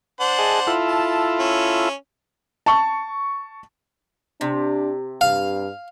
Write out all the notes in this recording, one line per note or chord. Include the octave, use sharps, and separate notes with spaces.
D4 C5 F#5
G#4 D#5 A5
E4 F4 A4
A5
C#4
A5 C#6
C3 D4
G2 F5